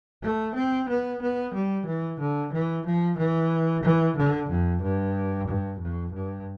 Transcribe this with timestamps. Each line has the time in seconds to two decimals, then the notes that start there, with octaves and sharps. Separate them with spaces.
0.23 A3
0.55 C4
0.89 B3
1.21 B3
1.54 G3
1.86 E3
2.20 D3
2.53 E3
2.85 F3
3.18 E3
3.83 E3
4.16 D3
4.49 F2
4.82 G2
5.47 G2
5.79 F2
6.12 G2